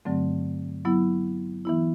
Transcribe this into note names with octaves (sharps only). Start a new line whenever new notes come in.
G2 D3 F#3 A3 C4
F#3 B3 E4
E3 B3 E4